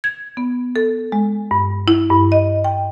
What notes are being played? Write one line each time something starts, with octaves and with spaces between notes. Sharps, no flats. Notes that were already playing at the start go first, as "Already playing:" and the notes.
G#6
B3
A4
G#3
G2
E4
G2
D#5
G5